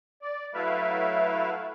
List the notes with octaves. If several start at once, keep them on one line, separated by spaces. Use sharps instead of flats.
D5
F#3 A3 E4 B4 E5 F5